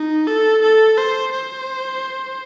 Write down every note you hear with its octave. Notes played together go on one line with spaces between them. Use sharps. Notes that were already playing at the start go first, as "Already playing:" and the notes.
Already playing: D#4
A4
A4
C5
C5